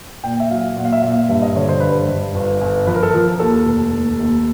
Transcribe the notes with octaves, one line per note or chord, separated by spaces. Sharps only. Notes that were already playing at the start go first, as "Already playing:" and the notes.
A#2 G5
E5
F#3 F5
A#2 F#5
F5
E5
A#2 F5
G2 E5
D#5
D3 C#5
C5
G2 B4
C5
G2
G1
G1
F3 B4
A#4
A4
F3 A#4
D#2 A4
F1
D#2
D#2